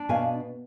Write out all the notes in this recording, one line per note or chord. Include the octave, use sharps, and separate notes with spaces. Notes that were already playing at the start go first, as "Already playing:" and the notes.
Already playing: D4
B2 F5 G#5